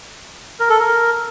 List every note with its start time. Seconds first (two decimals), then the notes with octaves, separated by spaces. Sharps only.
0.60 A#4
0.70 A4
0.79 A#4